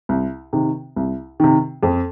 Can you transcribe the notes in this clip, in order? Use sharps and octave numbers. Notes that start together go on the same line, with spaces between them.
C2
C3 D#3
C2
C3 D#3
F2